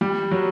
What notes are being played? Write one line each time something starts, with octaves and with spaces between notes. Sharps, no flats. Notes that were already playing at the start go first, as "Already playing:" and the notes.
G3
F#3